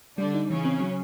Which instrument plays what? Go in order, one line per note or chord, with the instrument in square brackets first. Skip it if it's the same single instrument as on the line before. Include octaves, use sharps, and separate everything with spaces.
[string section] D3 D4 [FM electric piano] G3
[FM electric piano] D#4
[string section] C#3 C#4 [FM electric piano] E3
[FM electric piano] C4
F#3